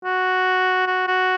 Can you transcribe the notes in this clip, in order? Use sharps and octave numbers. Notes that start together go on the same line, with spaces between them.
F#4
F#4
F#4